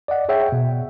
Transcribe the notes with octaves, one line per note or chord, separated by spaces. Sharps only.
D5 D#5 F#5
G#4 C#5 E5 F#5 G5
B2